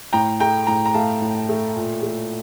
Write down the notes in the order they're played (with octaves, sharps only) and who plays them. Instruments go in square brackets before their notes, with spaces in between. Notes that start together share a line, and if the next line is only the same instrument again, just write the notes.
[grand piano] A2 G5 A#5
A3 G5 A#5
A2 G5 A#5
A#5
A3 F5 A5
A2
A3
A#2
A3